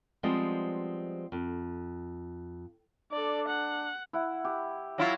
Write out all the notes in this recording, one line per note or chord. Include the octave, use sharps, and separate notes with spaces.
F3 G3 G#3 B3 C4 D#5
F2
D4 A4 D5
F#5
E4 F#5
G4
F#3 E4 F4